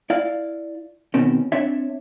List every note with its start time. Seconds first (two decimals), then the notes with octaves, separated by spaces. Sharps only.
0.10 E4 D5 F5
1.14 B2 D#3 C4 C#4
1.52 C4 D4 C#5 E5